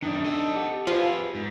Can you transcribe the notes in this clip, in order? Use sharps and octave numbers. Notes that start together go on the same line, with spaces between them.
F#2 D#3 D4 D#4 D5
A4 D#5
G4 F#5
F3 F4 G#4 B4
G#2